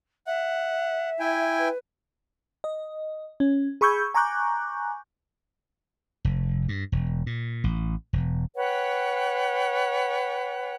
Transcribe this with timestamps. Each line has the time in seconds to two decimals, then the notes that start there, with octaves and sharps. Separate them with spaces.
0.27 E5 F#5
1.20 E4 G5 G#5
1.59 B4
2.64 D#5
3.40 C#4
3.81 G#4 B5 C#6 E6 G6 G#6
4.14 G#5 A#5 C#6 D6 F#6 G6
6.25 F1
6.69 G2
6.92 E1
7.26 A#2
7.64 A1
8.13 E1
8.56 B4 C#5 F#5 G5